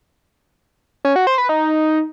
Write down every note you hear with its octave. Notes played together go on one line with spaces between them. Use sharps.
C#4
F#4
C5
B4
D#4